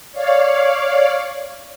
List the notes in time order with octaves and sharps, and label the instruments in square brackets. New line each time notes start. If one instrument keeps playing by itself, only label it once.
[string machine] C#5 D5 F5